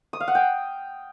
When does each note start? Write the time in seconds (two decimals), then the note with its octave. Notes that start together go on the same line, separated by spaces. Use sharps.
0.13 D#6
0.20 F5
0.28 F#5
0.35 G5